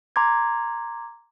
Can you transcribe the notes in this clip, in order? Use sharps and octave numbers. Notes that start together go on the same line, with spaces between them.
A#5 C6 D6 G#6